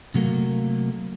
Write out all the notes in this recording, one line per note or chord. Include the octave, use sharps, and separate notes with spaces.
C3 F#3 A3 A#3